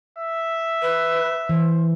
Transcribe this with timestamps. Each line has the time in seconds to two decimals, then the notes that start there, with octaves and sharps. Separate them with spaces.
0.18 E5
0.82 B4
1.49 E3 C5